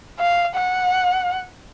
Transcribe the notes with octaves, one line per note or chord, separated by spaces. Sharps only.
F5
F#5